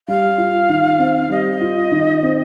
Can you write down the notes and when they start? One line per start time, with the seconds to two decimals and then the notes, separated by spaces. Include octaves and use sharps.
0.07 G3 F5
0.38 F4
0.69 D#3
0.99 C4
1.30 G3 D#5
1.61 F4
1.92 D#3
2.23 C4